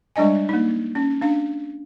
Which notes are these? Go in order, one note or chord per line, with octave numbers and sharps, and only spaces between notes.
G3 G#3 D4 D#5 G#5
A#3 D#4
C#4
D4 F5